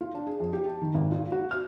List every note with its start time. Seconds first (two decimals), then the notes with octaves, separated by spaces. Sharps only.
0.01 F4
0.14 D4
0.27 G#4
0.40 F2
0.53 G4
0.66 A5
0.82 D#3
0.94 G#1
1.12 A#2
1.32 F#4
1.51 F6